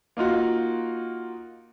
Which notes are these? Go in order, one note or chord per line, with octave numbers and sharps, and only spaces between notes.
A#3 D#4 F4 F#4